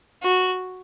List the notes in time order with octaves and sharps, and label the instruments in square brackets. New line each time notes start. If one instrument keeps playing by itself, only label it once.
[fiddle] F#4